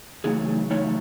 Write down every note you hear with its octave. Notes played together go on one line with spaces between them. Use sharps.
E2 C#3 F#3 A3 D#4 G#4
E2 C#3 F#3 A3 D#4 C#5